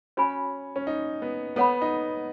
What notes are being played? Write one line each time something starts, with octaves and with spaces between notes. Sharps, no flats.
C#4 F#4 C#5 G#5 B5
C#4
D#4
B3
B3 A4 C#5 F#5 B5
D#4